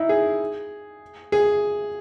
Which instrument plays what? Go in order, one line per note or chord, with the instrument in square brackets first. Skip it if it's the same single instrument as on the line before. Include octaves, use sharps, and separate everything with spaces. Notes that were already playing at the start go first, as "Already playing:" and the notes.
Already playing: [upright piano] D#4 E4
G#4
G#4